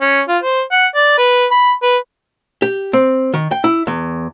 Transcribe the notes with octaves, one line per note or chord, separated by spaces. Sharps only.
C#4
F4
C5
F#5
D5
B4
B5
B4
G4
C4
D#3
G5
E4
E2